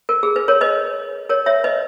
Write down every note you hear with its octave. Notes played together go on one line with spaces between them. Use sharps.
A#4
G#4
B4
A#4 C#5
B4 D#5
A#4 C#5
C#5 E5
B4 D#5